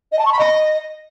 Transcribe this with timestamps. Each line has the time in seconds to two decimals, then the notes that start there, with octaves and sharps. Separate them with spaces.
0.12 D#5
0.18 A5
0.25 C#6
0.32 B5
0.39 D#5